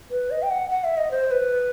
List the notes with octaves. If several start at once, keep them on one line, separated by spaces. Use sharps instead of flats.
B4
D#5
G5
F#5
F#5
E5
D#5
C5
B4